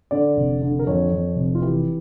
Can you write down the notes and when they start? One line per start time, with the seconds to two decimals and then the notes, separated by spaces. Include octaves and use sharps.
0.11 D3 D5
0.36 F1
0.62 D3
0.79 A#4
0.87 F2 C#5
1.11 F2
1.36 F1
1.55 F4
1.61 E3 G4